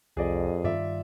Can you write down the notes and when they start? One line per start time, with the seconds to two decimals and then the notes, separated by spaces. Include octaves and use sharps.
0.17 C2 F2 G#4 D5 D#5
0.64 G2 D#3 G3 F4 D5 E5